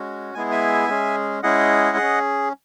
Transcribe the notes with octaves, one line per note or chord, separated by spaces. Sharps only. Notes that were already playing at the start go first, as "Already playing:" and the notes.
Already playing: G#3 C#4 F#4
G#3 B3 E4 G#4 G#5
E5 G#5
G#3 C#4 G#4
G#3 C#4 E4 G#4 D#5 F#5
C#4 G#4